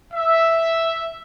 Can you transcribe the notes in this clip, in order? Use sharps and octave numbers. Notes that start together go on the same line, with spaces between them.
E5